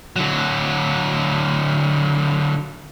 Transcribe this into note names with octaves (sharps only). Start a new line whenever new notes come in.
D3 F#3